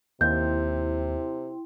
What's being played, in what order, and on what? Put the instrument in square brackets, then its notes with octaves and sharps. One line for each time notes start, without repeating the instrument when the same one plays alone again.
[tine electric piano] D#2 [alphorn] C3 [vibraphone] E4 G5 C6 [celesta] G6